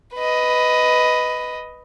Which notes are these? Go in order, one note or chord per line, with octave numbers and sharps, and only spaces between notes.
B4 D#5